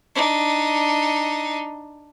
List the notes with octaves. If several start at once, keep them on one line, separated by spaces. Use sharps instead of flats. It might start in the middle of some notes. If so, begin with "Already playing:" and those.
D4 D#4